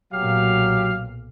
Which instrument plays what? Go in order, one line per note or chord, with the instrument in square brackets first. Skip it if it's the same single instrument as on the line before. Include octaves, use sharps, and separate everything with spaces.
[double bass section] B1 A#2 [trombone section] F#3 [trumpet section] G4 F5